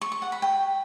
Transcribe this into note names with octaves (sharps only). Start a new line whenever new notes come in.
C#6
C#6
F#5
B5
G5